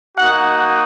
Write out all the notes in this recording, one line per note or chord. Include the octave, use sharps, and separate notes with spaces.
A#3 D#4 F#4 F#5